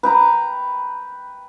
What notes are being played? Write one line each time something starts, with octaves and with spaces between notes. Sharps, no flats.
B4 G5 A#5